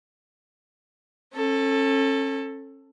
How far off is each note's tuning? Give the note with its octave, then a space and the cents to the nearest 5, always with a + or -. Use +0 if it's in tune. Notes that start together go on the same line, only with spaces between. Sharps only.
C#4 -35 A4 +10